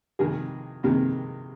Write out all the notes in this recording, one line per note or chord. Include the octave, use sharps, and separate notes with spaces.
F2 C3 D#3 G#3 G#4
F2 C3 D#3 G#3